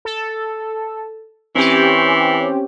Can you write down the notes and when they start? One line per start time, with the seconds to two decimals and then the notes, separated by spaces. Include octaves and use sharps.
0.05 A4
1.55 E3 C4 C#4 G4